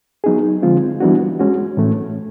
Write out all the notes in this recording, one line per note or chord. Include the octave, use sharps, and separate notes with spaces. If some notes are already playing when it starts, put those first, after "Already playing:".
F#3 B3 D#4 G#4
D3 F3 G#3 C4 F4
E3 G3 B3 D4 F#4
G#3 C#4 F#4
A2 E3 A3 C#4